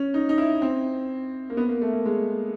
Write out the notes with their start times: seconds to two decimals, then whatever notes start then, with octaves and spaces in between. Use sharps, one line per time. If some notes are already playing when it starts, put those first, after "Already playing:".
Already playing: C#4
0.14 D#4
0.29 D#4
0.38 E4
0.62 C4
1.50 A#3
1.57 B3
1.69 A#3
1.81 A3
1.93 A#3
2.05 G#3